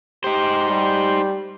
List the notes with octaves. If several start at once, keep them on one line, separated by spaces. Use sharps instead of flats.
D#4 G4 C5
G3